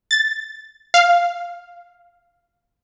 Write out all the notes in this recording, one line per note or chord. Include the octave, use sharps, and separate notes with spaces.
A6
F5